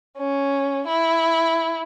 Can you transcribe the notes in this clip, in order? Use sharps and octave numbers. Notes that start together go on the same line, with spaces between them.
C#4
E4